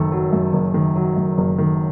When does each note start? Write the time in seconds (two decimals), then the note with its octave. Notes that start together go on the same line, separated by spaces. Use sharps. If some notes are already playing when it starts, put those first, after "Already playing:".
Already playing: F#1 F#2 D#3 A4
0.12 F#3
0.33 F#2
0.53 F#1
0.74 D#3
0.95 F#3
1.17 F#2
1.38 F#1
1.58 D#3